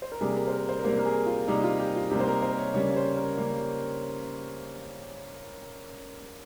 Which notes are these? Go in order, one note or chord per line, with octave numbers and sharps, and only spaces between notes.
C5
A#4
C3 G3 A#3 G#4
A#4
C5
A#4
C5
A#4
C3 G3 A#3 C5
A#4
G#4
F4
C3 G3 A#3 D#4
F4
G4
F4
C3 G3 A#3 G4
C5
A#4
C5
C#5
C#3 G3 A#3 C#5
C#5
C5
A#4
C#3 G3 A#3